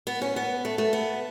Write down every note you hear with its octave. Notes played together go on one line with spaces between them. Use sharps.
B3
C#4
B3
A3
A3
B3